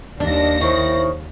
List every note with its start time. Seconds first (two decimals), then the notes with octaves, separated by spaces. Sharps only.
0.20 D#2 D4 D5 A#6
0.61 D#3 E4 C5 C#5 C#6